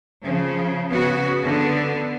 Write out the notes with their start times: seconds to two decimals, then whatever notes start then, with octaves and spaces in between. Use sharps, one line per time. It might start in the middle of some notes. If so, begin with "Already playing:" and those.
0.24 C#3 F3
0.90 C#3 B3 F#4
1.43 D3 B3